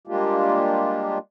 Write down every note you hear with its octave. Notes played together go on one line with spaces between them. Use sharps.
G3 G#3 A#3 D4 F4 G4